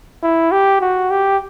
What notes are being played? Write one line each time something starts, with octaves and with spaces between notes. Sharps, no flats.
E4
G4
F#4
G4